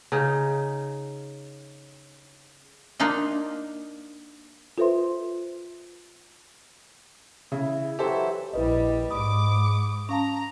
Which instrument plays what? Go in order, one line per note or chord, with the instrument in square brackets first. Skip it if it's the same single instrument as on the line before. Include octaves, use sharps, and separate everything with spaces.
[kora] C#3 D#4
[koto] A#3 D4 D#4 F4 D#5
[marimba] F4 A4 B4 C5 E5 C6
[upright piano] C#3 [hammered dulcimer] E4
[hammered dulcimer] E3 F#3 [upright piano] G4 A4 C5
[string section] A#1 G3 [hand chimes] E4 B4 D#5
[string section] G#2 D6 [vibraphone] B5 [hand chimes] D#6
[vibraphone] C#4 F5 A5 [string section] A#5